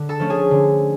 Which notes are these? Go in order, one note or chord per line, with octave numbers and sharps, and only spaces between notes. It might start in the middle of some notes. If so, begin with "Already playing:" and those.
Already playing: D3
A4 A5
F3 A3 C#4
G#4 G#5
D3